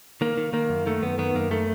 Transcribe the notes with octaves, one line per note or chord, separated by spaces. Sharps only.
D#3 A#3
D#3
D#3 A#3
F#2
D#3 A3
F#2 B3
D#3 B3
F#2 A#3
D#3 A3